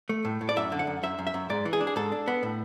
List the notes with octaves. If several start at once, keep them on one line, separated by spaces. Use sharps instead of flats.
A3
A2
A2
D5
F#2 E5
D3
F#5
F#2
F#2 E5
F#2
E5
F#2
G#2 D5
E3
G#4
D4
G#4
G#2 A4
D4
B3
A2